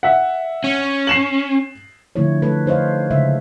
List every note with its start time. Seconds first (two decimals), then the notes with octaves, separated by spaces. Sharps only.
0.03 E5 F#5
0.64 C#4
1.07 C7 E7 F#7
2.16 D3 F3 A3 E4 F4 C#5
2.42 A3 A4 B4
2.66 D#4 C5 C#5 D#5 F5
3.11 C#3 G#3 E5